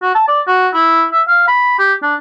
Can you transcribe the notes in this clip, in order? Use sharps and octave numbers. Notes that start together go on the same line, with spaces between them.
F#4
A5
D5
F#4
E4
E5
F5
B5
G4
D4